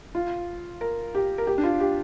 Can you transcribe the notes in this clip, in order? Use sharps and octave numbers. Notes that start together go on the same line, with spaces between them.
F4
A#4
G4
A#4
G4
D4
F4
G4